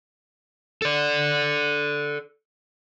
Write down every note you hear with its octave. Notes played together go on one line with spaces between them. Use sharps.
A4 D5